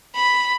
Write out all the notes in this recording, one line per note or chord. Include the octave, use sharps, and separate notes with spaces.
B5